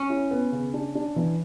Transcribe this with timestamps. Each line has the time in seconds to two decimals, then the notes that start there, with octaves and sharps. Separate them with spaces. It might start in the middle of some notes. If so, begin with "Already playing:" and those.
Already playing: C#4
0.10 E4
0.31 B3
0.52 C#3
0.74 D4
0.95 D4
1.16 E3